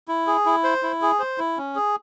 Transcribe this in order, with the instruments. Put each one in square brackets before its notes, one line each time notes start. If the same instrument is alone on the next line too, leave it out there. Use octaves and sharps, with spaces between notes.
[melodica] E4
G#4
E4
C5
E4
G#4
C5
E4
C#4
G#4